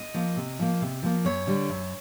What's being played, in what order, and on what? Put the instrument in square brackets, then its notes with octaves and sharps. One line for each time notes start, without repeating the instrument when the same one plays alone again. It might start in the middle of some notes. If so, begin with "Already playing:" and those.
Already playing: [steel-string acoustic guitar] D#5
F3 A#3
C3
F3 A#3
C3
F3 A#3
F#2 C#5
D3 G3
F#2